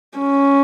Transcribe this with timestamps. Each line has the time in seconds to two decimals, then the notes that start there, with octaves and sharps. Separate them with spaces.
0.19 C#4